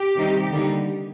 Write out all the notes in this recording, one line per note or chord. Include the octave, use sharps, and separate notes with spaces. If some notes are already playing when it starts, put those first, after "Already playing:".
Already playing: G4
C3 D#3 G3 C4 D#4
D3 G3 A#3 D#4